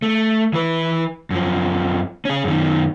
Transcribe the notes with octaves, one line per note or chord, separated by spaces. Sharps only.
A3
E3 B4
F#2 F3
C#4 G#4
F#2 D#3